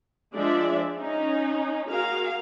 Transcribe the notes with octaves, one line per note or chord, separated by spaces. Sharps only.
F3 G#3 D4 D5 E5
C#4 D#4
F#4 G#4 A#4 F5